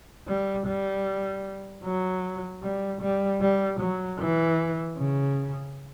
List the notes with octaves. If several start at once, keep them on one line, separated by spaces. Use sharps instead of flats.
G3
G3
F#3
G3
G3
G3
F#3
E3
C#3